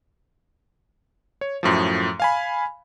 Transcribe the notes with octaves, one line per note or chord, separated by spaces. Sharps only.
C#5
F#2 A2 F3
F5 G#5 B5